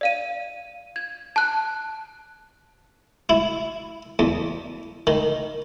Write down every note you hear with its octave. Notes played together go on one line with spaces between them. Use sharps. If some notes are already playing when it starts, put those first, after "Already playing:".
D5 F5 D#7
G#6
A5 F#6
E4
E2
D#3